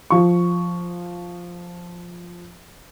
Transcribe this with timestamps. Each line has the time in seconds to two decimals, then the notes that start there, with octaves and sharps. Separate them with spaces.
0.10 F3 C#6